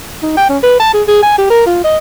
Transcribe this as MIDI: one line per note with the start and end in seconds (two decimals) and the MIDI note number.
0.23 0.35 63
0.37 0.46 79
0.49 0.58 61
0.63 0.78 71
0.80 0.93 81
0.94 1.03 68
1.08 1.19 68
1.23 1.35 80
1.38 1.46 67
1.50 1.65 70
1.66 1.83 65
1.84 1.98 75